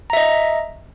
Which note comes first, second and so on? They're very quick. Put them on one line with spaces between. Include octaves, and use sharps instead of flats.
A#5 E5 D#5